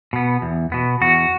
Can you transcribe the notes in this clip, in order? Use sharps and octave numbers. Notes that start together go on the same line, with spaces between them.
B2 B3
E2
B2 B3
E2 F#4